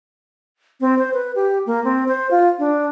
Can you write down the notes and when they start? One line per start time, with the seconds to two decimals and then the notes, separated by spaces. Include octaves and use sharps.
0.81 C4
0.99 C5
1.14 B4
1.35 G4
1.66 A#3
1.84 C4
2.08 C5
2.31 F4
2.59 D4